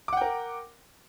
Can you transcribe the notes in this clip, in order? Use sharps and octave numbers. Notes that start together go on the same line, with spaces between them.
A#4 F#5 G5 D6